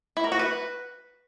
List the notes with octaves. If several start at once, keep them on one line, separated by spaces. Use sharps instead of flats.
E4
A#4
F#4
B4